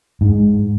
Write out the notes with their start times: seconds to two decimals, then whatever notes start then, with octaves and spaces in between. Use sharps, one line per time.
0.21 G#2